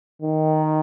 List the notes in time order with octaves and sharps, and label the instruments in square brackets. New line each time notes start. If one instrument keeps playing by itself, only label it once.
[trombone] D#3